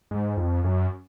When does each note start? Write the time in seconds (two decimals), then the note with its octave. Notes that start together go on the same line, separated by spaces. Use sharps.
0.11 G#2
0.37 F2
0.64 F#2